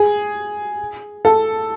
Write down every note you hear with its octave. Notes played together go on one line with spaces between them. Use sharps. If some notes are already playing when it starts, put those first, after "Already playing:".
Already playing: G#4
A4